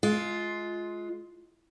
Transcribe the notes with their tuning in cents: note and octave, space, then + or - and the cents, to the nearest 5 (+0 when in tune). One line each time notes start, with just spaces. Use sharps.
G#3 +25 F4 +0